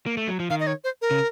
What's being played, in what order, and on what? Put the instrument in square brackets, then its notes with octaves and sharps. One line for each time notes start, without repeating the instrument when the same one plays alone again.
[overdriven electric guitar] A#3
A3
F#3
F3
[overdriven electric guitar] D#3 [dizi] F5
[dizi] D#5
C#5
C5
A#4
[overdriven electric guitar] C#3